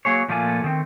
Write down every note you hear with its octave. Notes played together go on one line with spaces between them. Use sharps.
F#3 A#3 G#4 C#5
A#2 F3 A3 A#3 F4 G#5
D#3 A3 C4